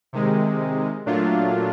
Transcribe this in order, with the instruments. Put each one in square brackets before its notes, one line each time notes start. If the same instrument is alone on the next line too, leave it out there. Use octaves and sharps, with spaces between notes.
[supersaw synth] C3 D#3 G#3
A#2 F#3 A3 D4 F4